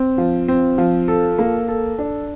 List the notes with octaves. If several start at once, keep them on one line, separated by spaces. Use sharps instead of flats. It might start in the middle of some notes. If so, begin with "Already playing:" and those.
Already playing: C4
F3
C4
F3
A4
A#3
A4
D4